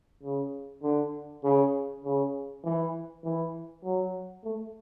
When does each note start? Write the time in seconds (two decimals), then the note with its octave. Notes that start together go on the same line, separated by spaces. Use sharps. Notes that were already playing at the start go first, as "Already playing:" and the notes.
0.23 C#3
0.83 D3
1.44 C#3
2.04 C#3
2.64 E3
3.24 E3
3.84 F#3
4.44 A3